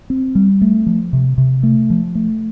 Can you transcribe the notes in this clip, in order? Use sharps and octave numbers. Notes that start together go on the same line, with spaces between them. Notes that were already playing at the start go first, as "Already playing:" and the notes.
C4
G3
A3
F3
C3
C3
A3
F3
A3